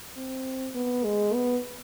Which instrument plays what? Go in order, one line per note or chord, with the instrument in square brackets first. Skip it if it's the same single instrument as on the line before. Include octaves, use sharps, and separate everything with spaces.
[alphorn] C4
B3
G#3
B3